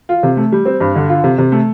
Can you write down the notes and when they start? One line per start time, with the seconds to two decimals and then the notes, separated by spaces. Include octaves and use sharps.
0.09 F4
0.23 C3
0.37 A3
0.52 G3
0.66 C4
0.80 G2
0.95 D3
1.09 F4
1.24 C3
1.38 C3
1.52 A3